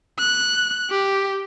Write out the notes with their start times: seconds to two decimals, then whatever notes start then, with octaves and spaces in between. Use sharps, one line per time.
0.19 F#6
0.91 G4